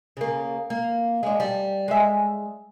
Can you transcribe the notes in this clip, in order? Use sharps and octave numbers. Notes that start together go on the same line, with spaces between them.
C#3 A#3
A#3
G#3 D4
G3
G#3 E5